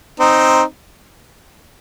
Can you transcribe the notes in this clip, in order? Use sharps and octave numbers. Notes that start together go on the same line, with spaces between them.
C4 D#4